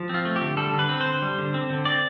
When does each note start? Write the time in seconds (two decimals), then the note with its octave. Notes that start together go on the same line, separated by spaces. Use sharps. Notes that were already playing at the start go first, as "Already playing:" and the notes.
Already playing: F3
0.09 C4 F4
0.25 A3
0.36 G4
0.42 D3
0.57 G3 A4
0.73 D3
0.79 B4
0.89 C4
1.01 D3 C5
1.22 G3
1.38 D3
1.54 C4
1.70 D3
1.85 C4 D5